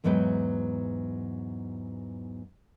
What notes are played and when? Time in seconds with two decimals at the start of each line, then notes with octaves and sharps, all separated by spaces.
0.04 E2 G#2 F#3 B3 B4 G5